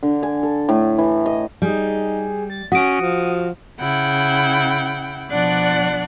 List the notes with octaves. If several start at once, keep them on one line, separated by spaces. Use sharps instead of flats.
D3
G#5
A4
A2
E3
D#5
G3 D#4 G#4
A6
C#4 F#4 F#5 D#6 D7
F3
C#3 E4 F#5 G5
B2 F3 D4 D5 F#5 F#6